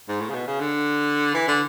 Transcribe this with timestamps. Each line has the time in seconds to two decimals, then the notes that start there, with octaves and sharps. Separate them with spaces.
0.08 G#2
0.21 A2
0.30 C#3
0.34 B2
0.47 C#3
0.60 D3
1.34 E3
1.48 D3